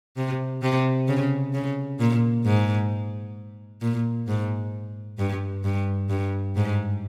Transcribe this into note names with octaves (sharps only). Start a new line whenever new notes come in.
C3
C3
C#3
C#3
A#2
G#2
A#2
G#2
G2
G2
G2
G#2